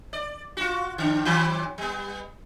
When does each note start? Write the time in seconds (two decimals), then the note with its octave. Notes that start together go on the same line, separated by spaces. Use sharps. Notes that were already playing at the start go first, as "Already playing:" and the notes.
0.13 D5
0.57 F4 F#4
0.98 D3 D4
1.25 D#3 F#3 C4
1.78 G3 B3